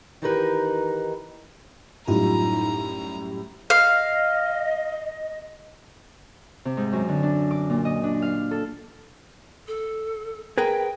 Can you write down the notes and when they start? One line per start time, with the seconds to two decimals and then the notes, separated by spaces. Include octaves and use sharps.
0.22 D#3 E3 D#4 G4 A#4 B4
2.07 F#2 A2 G3 D#4 F4 A#5
3.70 D#5 F5
6.65 C3
6.77 G#2
6.92 F#2
7.08 D3
7.23 D4
7.51 D6
7.70 A#2
7.85 D#5
8.03 D4
8.22 F5
8.51 A4
9.68 A4
10.58 G#4 A#4 B4 G5